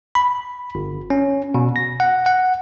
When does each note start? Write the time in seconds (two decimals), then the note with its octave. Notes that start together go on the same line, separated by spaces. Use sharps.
0.15 B5
0.75 G1
1.10 C#4
1.54 B2
1.76 A#6
2.00 F#5
2.26 F#5